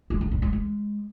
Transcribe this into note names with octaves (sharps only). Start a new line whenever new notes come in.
G#3
D3
A#2
G#3
G#3